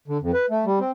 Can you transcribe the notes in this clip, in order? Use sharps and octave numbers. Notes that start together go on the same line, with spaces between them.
D3
F2
B4
A3
G3
C4